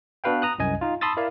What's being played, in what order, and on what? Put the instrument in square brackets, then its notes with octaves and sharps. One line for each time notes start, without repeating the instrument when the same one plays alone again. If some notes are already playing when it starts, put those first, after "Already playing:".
[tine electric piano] B3 D4 F#4 B4 F5 G5
A#5 D#6 F#6
C2 F#2 D#5 G#5
D#4 F4
A5 B5 C6 D#6 E6 A6
E4 A#4 D5 F5